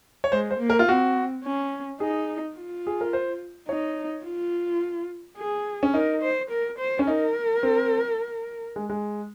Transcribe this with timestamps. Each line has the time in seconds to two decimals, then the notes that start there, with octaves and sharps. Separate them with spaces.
0.24 C#5
0.32 G#3 C5
0.51 C5
0.60 A#3
0.70 A#4
0.79 F4
0.88 C4 F#4
1.44 C#4
2.00 D#4 G#4
2.57 F4
2.87 G#4
3.01 A#4
3.13 C5
3.69 D#4 C#5
4.25 F4
5.37 G#4
5.83 C#4
5.94 D#4 A#4
6.22 C5
6.51 A#4
6.79 C5
6.99 C#4
7.07 D#4 A#4
7.63 C4
8.76 G#3
8.90 G#3